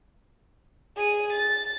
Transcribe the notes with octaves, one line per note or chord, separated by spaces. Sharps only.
G#4 D#7
A6